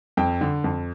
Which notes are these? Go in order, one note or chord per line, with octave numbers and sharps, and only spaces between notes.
F2 G5
D3
F2